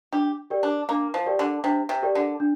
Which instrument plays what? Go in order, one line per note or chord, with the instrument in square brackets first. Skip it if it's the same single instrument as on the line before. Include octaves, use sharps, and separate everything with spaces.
[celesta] D4 [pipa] G4
[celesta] G4 A#4 D5 G5
[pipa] D4
[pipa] A#3 [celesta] D4
[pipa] F3
[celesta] G4 A#4 D5 G5
[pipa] D3
[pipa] C3 [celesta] D4
[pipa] C3
[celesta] G4 A#4 D5 G5
[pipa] D3
[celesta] D4